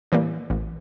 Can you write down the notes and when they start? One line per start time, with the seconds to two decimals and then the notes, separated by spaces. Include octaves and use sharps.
0.12 A2 E3 G3 A#3
0.50 A1